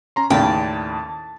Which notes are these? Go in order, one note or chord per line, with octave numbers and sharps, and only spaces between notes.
C#4 A#5 C6
D#2 A2 C#3 D5 G5 A5